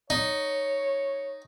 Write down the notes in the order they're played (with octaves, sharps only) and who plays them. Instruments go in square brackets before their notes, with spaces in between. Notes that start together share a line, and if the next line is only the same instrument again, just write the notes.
[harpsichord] D#4 [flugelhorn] C#5